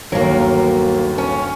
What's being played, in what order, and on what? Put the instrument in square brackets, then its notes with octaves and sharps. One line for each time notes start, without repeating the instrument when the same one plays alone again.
[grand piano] G1 D#2 [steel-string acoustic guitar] F#3 A#3
[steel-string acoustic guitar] C#4